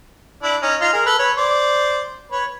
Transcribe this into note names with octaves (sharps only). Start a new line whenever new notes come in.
D4 E4
C#4 D#4
D#4 F4
G#4 A#4
A4 B4
B4 C#5
C5 D5
B4 C#5